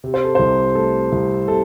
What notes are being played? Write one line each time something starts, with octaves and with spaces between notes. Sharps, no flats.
C3
C5
A4
C2 C5
A3 A4
C2
C3 A4